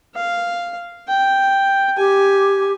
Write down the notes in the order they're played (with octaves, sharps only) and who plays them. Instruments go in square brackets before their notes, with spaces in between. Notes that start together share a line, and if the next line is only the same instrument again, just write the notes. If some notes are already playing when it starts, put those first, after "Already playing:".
[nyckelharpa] F5
G5
[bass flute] G4 [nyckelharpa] G#5